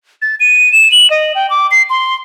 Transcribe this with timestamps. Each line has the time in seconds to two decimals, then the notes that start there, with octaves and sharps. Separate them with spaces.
0.22 A6
0.40 D#7
0.72 E7
0.92 F#7
1.10 D#5
1.35 G5
1.50 D6
1.71 C7
1.90 C6